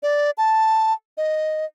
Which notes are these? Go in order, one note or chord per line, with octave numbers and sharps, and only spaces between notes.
D5
A5
D#5